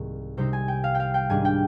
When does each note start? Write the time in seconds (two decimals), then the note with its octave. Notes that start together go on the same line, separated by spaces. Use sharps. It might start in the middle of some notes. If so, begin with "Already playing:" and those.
Already playing: C2 G#2 D#3 A#3
0.37 C3 G3 C4 D#4 C5
0.53 G#5
0.68 G5
0.84 F5
0.95 G5
1.00 F5
1.14 G5
1.30 G#2 D#3 G3 D4 G#5
1.45 G5